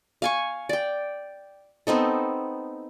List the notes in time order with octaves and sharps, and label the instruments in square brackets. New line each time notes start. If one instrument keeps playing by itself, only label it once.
[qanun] F5 G#5 C#6
D5 G5
B3 C4 D#4 A4